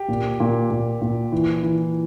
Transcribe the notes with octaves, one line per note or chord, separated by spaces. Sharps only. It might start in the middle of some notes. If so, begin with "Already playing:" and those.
Already playing: G4
A#2
A#2
A#2
A#2
E3
E3